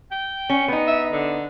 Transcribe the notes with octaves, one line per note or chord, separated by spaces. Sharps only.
G5
C#4
B3 D#4
E5
D3